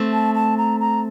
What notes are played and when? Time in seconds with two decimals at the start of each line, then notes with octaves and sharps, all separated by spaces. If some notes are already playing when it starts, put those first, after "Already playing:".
Already playing: A3 C4
0.13 A5
0.35 A5
0.58 A#5
0.80 A#5